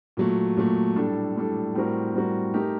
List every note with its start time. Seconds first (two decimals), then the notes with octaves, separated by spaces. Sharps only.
0.17 A#2 F#3 A3
0.57 A#2 F#3 A3
0.96 A2 G3 D4 A4
1.36 A2 G3 D4 A4
1.75 A2 G3 C4 F#4 A#4
2.15 A2 G3 C4 F#4 A#4
2.54 A3 D#4 G4 A#4